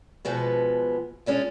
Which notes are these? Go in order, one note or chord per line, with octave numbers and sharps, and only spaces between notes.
B2 F3 G#3 B3
G#3 C#4 D4 F4